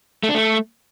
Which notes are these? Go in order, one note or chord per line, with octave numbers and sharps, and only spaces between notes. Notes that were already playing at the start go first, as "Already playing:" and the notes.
A3
D4
A3